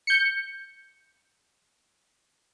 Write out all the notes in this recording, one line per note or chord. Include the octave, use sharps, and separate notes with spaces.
G6 C#7